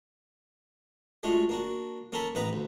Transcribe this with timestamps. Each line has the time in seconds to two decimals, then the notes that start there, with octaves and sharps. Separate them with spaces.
1.23 G#3 A3 D4 F4 F#4
1.49 A#3 D4 F#4
2.12 A#3 C#4 A4 A#4 A5 B5
2.35 A1 D#4 B4 A#5 B5
2.53 D2